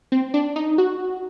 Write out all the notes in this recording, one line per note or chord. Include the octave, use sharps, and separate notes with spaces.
C4
D4
D#4
F#4